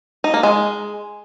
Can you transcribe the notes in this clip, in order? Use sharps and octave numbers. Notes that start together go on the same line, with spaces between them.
D#4
A#3
G#3